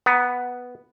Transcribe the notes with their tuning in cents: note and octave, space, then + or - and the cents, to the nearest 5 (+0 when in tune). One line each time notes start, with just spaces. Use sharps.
B3 +0 A#5 +45